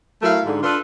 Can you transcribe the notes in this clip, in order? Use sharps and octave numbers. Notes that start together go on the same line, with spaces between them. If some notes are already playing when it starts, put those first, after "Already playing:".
F#3 A3 E4 A#4 F5
G#2 D3
D4 F4 A4 B4